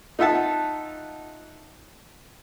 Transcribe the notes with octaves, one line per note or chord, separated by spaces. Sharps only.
D#4 F4 E5 F#5 A5